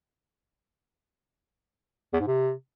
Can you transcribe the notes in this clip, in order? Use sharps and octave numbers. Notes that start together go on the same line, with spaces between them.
E2
G#2
C3